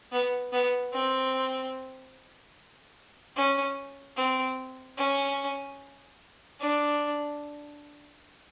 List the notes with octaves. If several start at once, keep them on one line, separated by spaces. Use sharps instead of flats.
B3
B3
C4
C#4
C4
C#4
D4